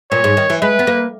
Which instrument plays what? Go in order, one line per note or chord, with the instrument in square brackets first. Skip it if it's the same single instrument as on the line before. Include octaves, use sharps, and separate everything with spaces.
[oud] A#2 [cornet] C#5
[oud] G#2
D#3
E3
[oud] G#3 [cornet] B4
[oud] B3
A#3